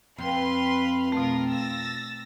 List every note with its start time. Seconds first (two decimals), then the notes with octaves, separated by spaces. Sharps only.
0.18 F2 B4 F5 C6
1.12 B2 A3 F4 A#4
1.49 E6 A6 A#6